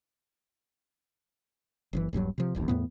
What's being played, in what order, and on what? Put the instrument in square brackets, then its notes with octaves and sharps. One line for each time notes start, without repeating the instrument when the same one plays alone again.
[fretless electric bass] F#1 C#3 E3
D#1 G2 C3 F#3
C3 F3
D1 A1 D#2
E2 A2 B3